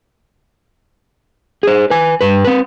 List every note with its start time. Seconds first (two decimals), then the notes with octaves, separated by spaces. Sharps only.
1.63 G#4 C5
1.90 B4 G#5
2.21 G2 B4
2.44 C4 B4